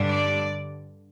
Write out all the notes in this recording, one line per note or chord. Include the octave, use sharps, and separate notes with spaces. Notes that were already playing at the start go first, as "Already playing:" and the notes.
Already playing: G2 D3 G3 D4
D5